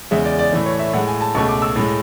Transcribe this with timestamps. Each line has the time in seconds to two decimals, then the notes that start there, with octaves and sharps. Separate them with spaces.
0.11 E2 C#3 G#3 E5
0.25 D5
0.39 D5
0.52 A2 E3 A3 D5
0.66 C#5
0.79 E5
0.93 A2 F#5
0.97 G#3
1.07 G#5
1.21 A5
1.35 C#2 B2 A3 C#6
1.48 D6
1.62 E6
1.76 A2 G#3